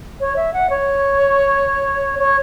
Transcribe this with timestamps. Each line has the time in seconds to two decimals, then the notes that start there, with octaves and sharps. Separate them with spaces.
0.20 C#5
0.36 E5
0.54 F#5
0.70 C#5
2.19 C#5